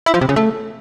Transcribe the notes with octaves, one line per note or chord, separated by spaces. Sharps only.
E4
F3
C3
C#3
A3